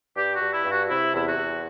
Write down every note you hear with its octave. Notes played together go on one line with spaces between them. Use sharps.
G2 G4
F#4
G2
E4
G2
F#4
F#4
C3 E4
E2 E4
F#4
E2